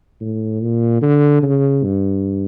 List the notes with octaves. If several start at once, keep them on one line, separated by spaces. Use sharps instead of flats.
A2
A#2
D3
C#3
G2